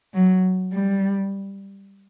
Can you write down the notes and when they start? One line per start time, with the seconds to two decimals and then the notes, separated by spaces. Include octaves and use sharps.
0.14 F#3
0.73 G3